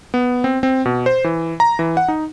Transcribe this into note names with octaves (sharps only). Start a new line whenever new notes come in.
B3
C4
C4
B2
C5
E3
A#5
E3
F#5
D#4